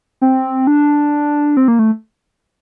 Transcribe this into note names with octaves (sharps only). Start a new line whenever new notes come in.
C4
D4
C4
A#3
A3